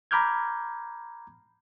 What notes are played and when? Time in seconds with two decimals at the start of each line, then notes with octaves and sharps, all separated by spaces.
0.11 A#5 B5 D6 F6 G6 G#6